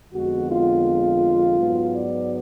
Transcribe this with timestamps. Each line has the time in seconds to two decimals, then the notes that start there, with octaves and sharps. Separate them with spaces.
0.13 F2 D3 G#3 B3 F#4
0.49 F4
1.58 G#2 F#3 B3
1.95 D5